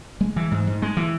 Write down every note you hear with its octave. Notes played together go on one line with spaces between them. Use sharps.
G#3
E3
G#2
G#2
G#3
E3